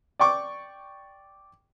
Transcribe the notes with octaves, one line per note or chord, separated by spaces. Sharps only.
D5 G5 C#6 D6